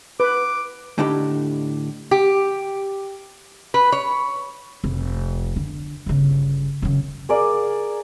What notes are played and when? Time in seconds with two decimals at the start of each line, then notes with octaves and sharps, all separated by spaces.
0.20 B4 D6
0.98 A2 D3 D4 D#4 G4 B5
2.11 G4
3.74 B4
3.92 C#5
4.84 F1
5.56 D3
6.06 G1 C#3
6.82 F#2 C#3
7.29 G#4 A#4 D5 F5